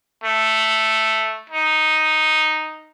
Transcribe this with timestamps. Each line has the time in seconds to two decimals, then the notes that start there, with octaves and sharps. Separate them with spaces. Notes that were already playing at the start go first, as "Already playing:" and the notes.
0.24 A3
1.50 D#4